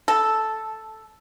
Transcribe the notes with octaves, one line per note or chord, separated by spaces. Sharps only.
A4